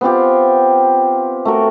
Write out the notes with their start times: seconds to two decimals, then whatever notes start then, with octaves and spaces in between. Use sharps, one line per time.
0.01 B3 C4 F4 G4
1.45 A3 F#4 A#4